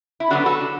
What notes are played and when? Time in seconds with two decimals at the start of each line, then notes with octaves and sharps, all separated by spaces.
0.20 E4
0.30 D3 F#3 B3 D4 F#4
0.46 F#4 A4
0.61 D3